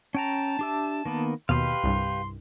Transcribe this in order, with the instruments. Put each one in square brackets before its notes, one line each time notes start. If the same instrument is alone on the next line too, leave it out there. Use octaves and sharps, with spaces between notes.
[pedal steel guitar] C#4 G5 A#5 [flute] A5
[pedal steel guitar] D4 G4 E5
D#3 A#3 B3
[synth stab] D#2 B2 [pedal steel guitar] G4 B4 F5 [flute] C6
[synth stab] C2 G2